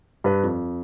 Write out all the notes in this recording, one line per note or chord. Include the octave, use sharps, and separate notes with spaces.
G2 B4
F2